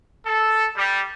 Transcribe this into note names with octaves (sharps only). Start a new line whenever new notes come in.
A4
G3